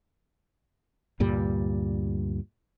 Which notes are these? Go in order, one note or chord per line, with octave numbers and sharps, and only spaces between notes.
D2 G2 A#2 G3